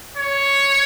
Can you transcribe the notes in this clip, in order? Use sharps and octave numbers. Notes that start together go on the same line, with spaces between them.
C#5